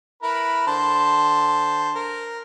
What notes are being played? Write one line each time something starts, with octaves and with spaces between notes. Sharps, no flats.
E4 A#4 B4
D3 C5 A5
A#4